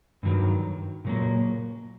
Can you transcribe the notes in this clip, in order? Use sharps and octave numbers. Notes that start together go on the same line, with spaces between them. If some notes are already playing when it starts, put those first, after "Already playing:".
G2 D#3 F#3
A#2 F#3 A#3